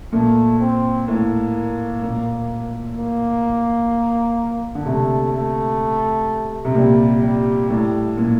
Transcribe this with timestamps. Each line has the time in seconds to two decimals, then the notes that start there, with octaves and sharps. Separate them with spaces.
0.12 A#2 A3
0.60 C4
1.08 A2 A#3
2.02 A#2
2.97 A#3
4.75 D3
4.86 C3 A3
5.33 A3
6.65 C3
6.75 A#2 G3
7.23 G3
7.69 A2 G3
8.17 A#2